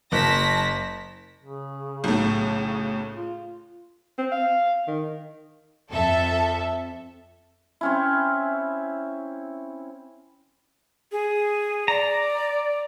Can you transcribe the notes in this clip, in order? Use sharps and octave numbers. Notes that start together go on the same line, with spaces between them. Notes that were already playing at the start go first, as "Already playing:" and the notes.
F#1 A5 A#6 B6
C#3
B1 A2
F4
C4
F5
D#3
F2 A4 E5
C4 C#4 E4
G#4
D5 A#5